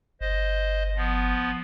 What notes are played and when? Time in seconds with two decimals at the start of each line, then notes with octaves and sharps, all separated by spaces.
0.21 G1 C5 D#5
0.96 F3 B3